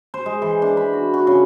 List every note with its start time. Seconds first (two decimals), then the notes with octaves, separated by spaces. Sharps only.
0.14 C5
0.26 G#3
0.42 E3
0.62 D4
0.77 B5
0.93 F#4
1.14 F#4
1.27 C#3